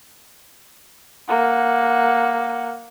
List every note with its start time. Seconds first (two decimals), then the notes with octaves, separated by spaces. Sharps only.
1.29 A#3 F#5